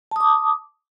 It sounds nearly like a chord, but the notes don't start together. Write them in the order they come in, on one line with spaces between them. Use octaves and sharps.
A5 D#6 D6